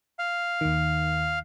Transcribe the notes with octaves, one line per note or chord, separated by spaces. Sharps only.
F5
D#2 D#3